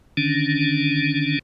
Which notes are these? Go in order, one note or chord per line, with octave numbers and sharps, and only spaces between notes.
D3 D#3 C#4 D4